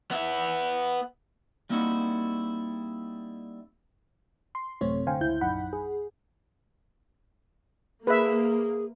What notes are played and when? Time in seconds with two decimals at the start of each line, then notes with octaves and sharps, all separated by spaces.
0.11 B3 E5
1.70 G3 A#3 C4 D#4 E4 F#4
4.55 C6
4.81 A1 F#2 C3 A3 C4 C#5
5.07 D3 C5 F5 G5 G#5
5.21 C#2 E4 G6
5.41 A#1 F#2 D#4 F#5 B5
5.73 G#4
8.07 A#3 G#4 B4 E5